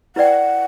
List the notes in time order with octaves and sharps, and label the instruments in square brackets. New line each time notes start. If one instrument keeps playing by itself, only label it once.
[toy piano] E4 B4 D5 G5 [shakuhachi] F#5